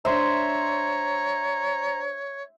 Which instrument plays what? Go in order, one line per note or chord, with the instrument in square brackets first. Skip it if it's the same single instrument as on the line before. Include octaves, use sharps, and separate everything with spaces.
[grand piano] D4 C5 [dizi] C#5 [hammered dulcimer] E5 C6 [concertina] A#5